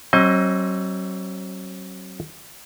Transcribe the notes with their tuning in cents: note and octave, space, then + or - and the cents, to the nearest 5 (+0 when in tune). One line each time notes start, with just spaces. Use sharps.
F#3 +30 C4 +45 D#5 +25